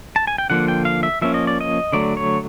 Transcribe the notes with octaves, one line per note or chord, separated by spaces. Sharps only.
A5
G#5
G5
D3 F3 A#3 F#5
G5
F5
E5
F3 A#3 C#4 E5
D#5
D5
D#5
D3 F#3 A3 D5
C#5